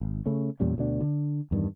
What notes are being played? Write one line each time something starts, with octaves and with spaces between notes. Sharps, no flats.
G#1
C#3 A3 C#4
E2 A#2 G3 C#4
D2 B2 D4
D3
E2 G2 D#3 G3